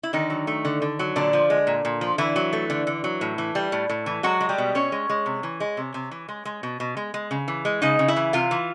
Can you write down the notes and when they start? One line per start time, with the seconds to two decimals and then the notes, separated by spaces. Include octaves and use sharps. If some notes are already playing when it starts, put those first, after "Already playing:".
0.03 E4
0.13 D3 D#3 D#4
0.30 F#3
0.47 A3
0.65 D3
0.82 D3
0.99 F#3
1.16 A#2 D3 D4
1.33 F3
1.50 G#3
1.67 A#2
1.85 A#2
2.01 F3
2.18 D3 E3 E4
2.36 F#3
2.53 A3
2.70 D3
2.87 D3
3.04 F#3
3.21 A2
3.38 E3
3.55 G3
3.72 A2
3.90 A2
4.06 E3
4.23 F#3 G#3 F#4
4.41 G#3
4.49 G3 G4
4.58 B2
4.75 B2 C#4 C#5
4.92 G#3
5.09 G#3
5.26 C3
5.43 E3
5.60 G#3
5.77 C3
5.94 C3
6.11 E3
6.29 G#3
6.45 G#3
6.63 B2
6.80 B2
6.97 G#3
7.14 G#3
7.31 C#3
7.48 E3
7.65 G#3
7.82 C#3 D#4 D#5
7.99 C#3
8.08 E4 E5
8.16 E3
8.33 C3 F4 F5
8.51 E3